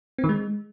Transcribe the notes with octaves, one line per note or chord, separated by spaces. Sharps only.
C4
D#3
G#3